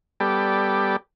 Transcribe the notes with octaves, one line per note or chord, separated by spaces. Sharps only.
G3 B3 G4 A4 D5